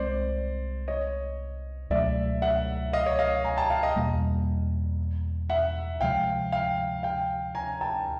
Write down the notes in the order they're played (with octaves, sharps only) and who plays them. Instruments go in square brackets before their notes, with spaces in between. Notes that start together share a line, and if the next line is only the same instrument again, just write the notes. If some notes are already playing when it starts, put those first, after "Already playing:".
Already playing: [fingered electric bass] C2 G#3 C4 [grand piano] C5 D5
[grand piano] C#5 D#5
[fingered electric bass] C#2 B2 F#3 A3 [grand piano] D5 E5
[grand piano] E5 F#5
D#5 F5
C#5 D#5
D#5 F5
G#5 A#5
G5 A5
F5 G5
D#5 F5
[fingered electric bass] E2 B2 G3 A#3
[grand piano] E5 F#5
[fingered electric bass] D2 C3 F3 G#3 [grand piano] F5 G5
[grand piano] F5 G5
F5 G5
G#5 A#5
G5 A5